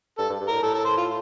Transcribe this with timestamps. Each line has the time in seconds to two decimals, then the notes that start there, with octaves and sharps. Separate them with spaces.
0.18 G2 A4
0.30 G2
0.41 G2
0.48 A2 A#4
0.62 A2 A4
0.74 A4
0.85 C5
0.97 F4